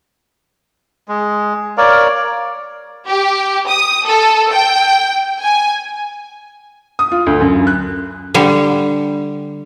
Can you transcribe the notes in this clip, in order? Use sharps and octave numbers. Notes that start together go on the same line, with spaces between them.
G#3
A#4 C#5 D5 F5
G4
D#6
A4
G5
G#5
D#6
F4
D2
F#2
F#6
D3 G3